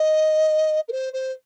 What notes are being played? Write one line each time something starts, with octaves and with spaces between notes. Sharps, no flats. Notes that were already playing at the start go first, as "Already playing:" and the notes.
Already playing: D#5
A#4
C5
C5